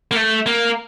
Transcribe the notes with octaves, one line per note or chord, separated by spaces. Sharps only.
A#3
A3
A#3